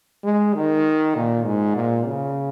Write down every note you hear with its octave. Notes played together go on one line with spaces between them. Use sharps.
G#3
D#3
A#2
G#2
A#2
C#3